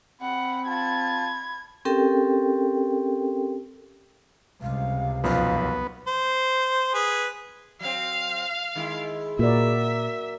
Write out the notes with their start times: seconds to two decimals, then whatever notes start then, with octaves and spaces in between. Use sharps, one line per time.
0.22 C4 F#5 B5
0.67 F4 A5 G#6
1.85 C4 C#4 G4 A4 A#4 G5
4.62 C#2 C3 G3 F5
5.24 B1 F#2 F3 B3 F5
6.07 C5
6.94 G#4 B4
7.80 F#3 C4 F5
8.75 D#3 G#3 E4
9.39 A#2 F#4 A#4 D5 E5